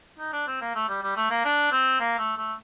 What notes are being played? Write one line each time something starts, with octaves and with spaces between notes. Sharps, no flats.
D#4
D4
C4
A#3
A3
G3
G3
A3
A#3
D4
C4
A#3
A3
A3